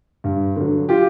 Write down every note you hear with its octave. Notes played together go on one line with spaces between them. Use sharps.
G2
D3 F#3
F4 G4